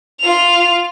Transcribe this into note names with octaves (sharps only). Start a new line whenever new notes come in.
F4 F7